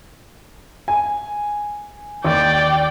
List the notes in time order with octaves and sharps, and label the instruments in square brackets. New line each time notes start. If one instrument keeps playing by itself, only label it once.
[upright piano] G#5
[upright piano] D#2 [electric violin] D5 G5